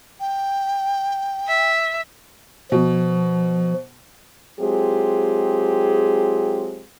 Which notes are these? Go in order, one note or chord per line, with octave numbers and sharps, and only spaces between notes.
G5
E5
B2 F3
F#3 G#3 C4 F4 G4 G#4